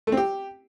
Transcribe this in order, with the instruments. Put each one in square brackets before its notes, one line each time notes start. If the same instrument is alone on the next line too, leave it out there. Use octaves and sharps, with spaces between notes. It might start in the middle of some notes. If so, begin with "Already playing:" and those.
[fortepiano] A3
C4
G4